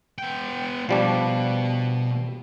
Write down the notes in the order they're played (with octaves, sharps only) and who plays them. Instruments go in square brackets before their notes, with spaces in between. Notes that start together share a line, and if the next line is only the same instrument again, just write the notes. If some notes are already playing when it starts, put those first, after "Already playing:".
[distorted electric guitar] B3 G5
[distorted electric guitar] B2 [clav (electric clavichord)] F3 G3 D4